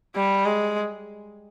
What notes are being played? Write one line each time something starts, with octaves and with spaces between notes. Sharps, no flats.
G3
G#3